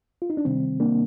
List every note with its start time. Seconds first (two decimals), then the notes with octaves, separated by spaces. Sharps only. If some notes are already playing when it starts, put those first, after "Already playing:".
0.22 F4
0.30 D#4
0.37 D4
0.45 C3 D#3 G3 C4
0.80 A#3 D4